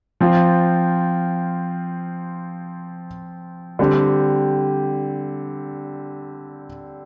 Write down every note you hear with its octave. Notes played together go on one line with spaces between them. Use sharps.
F3 C4 F4
D3 G3 C4 G4